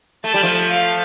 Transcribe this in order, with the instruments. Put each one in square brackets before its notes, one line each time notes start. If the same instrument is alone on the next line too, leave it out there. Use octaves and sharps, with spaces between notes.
[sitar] A3 [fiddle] A5
[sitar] G3
F3 A3
[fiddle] F5